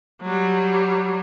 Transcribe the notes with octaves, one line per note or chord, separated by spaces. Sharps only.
F#3 G3